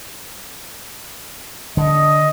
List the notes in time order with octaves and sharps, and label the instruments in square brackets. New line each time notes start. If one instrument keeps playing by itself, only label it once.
[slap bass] D3 [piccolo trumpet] D#5